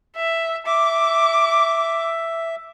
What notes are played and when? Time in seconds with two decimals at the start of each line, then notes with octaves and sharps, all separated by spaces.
0.16 E5
0.66 E5 D6